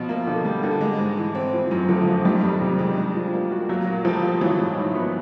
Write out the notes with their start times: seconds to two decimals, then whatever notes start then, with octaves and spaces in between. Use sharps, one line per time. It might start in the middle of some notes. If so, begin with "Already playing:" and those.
Already playing: B2 F3
0.09 A#3
0.27 D3
0.45 G3
0.63 D3
0.81 G#3
0.99 G#2
1.17 E3
1.35 C4
1.53 E3 F3
1.71 F#2
1.88 D3 F3
2.07 F#2
2.25 D#3 G3
2.43 F2
2.61 C3
2.79 G#3
2.97 D4
3.15 F3
3.33 A#3
3.51 F#4
3.69 F#3 A#3
3.87 A#2
4.05 F3 G3
4.23 A#2
4.41 E3 F#3
4.59 G#2
4.77 D#3
4.95 B3